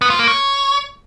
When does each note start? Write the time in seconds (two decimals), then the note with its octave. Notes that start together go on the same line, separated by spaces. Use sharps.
0.02 B3
0.10 F4
0.19 A#3
0.28 C#5